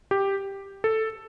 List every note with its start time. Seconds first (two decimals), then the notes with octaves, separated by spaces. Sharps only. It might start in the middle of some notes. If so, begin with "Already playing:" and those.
0.11 G4
0.84 A4